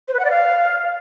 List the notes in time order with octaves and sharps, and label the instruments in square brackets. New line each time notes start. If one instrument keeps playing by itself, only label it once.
[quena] C5
B4
F#5
D5
F5